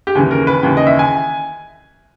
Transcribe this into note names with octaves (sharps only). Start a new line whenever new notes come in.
G4
D#2 C#3 E3 G#4
A#4
B4
D#2 C#3 E3 G5
D#5
E5
G#5